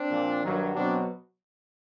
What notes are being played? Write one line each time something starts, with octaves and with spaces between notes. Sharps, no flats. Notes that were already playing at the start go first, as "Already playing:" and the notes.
Already playing: C4 D4
A#2 F3
G2 D#3 F#3
B2 F#3 C4 D4